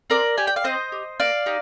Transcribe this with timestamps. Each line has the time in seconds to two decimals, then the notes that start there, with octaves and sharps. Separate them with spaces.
0.10 C4 A#4 D5
0.38 G4 G#5
0.47 G5
0.56 F5
0.64 C4 C5 D#5
0.92 G4
1.20 A#3 D5 F5
1.46 D#4 G4